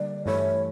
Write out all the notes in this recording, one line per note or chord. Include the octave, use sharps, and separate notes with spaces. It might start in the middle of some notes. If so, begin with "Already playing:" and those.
Already playing: D3 G3 A#3 D5
G2 E3 A3 E4 C#5